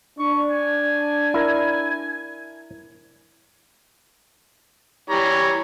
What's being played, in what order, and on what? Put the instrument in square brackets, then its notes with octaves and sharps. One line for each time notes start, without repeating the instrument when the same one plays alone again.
[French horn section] D4 [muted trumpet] C#6
[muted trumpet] G#5
[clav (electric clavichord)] E4 A#4
[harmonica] E3 G3 A#5 [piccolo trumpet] C#5